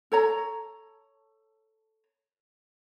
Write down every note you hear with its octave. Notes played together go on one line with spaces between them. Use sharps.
A4 C#5 A#5